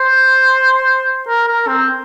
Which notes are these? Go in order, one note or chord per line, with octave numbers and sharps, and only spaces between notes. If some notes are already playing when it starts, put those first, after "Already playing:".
Already playing: C5
A#4
A#4
C4